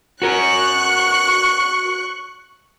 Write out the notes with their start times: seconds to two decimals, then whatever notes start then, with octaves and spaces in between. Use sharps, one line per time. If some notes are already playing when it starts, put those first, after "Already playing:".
0.22 F#4 A#4 C#6 F#6